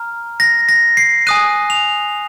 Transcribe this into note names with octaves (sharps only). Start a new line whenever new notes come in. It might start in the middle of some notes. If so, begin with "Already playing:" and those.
Already playing: A#5 F6
A#6
A#6
C7
G#5 D#6 F#6 D#7
F7